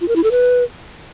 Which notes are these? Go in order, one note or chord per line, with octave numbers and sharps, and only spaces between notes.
F4
A#4
E4
A4
B4